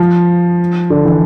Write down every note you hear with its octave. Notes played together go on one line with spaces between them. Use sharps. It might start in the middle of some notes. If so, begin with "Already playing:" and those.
Already playing: F3
D3
E3